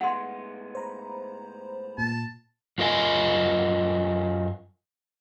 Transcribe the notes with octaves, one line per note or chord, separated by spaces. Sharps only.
A2 G#3 B3 F#5 C6
C5 A#5 B5
A#2 A5
F#2 F4 A#4 D#5 G#5